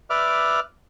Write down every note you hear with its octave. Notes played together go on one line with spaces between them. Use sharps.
B4 D5 E5 D6 F6